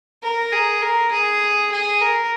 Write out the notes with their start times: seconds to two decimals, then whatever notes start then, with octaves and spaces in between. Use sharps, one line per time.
0.23 A#4
0.52 G#4
0.82 A#4
1.12 G#4
1.72 G#4
2.01 A#4